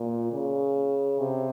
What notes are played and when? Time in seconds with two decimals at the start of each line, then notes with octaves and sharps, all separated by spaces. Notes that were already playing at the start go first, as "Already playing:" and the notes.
Already playing: A#2
0.32 C#3
1.19 C3